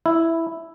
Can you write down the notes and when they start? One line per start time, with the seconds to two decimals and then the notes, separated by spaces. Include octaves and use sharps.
0.06 E4